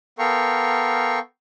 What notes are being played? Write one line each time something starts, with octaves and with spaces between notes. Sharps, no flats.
B3 A4 A#4 F5 G5 C#6